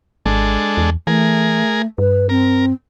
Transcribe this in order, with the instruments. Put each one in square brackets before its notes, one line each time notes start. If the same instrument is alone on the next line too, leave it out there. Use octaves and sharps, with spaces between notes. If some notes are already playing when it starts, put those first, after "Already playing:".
[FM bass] G#1 [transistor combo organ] G#3 D4 A4
[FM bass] E2
[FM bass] E3 [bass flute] A3 [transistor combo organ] G#4 A#4
[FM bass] G2 [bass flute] B4
[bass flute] C4 [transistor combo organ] A#4